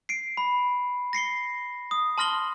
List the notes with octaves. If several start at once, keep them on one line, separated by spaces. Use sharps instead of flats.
C7 D7
B5
A#6 C7 C#7 G7
D#6
A5 C6 F6 A#6 F#7 G7